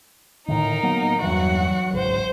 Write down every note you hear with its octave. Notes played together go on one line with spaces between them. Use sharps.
A2 D3 D#3 D#4 A#4
F#3 A#3 B3
E2 G2 E3 F#3 F#4 F#5
G#1 C#2 C5